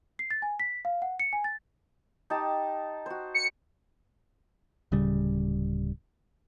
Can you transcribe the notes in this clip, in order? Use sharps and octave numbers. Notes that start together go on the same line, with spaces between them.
C7
A6
G#5
B6
F5
F#5
C#7
G#5
A6
D#4 G4 A5
F#4 C5
C#7
D1 C#3 G3